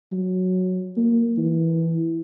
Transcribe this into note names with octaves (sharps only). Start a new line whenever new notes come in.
F#3
A#3
E3